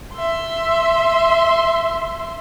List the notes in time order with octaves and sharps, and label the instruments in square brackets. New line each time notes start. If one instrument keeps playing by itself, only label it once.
[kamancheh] E5 C6